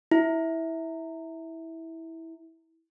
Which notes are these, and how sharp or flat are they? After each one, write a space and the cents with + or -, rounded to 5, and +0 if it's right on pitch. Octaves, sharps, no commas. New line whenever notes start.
E4 -15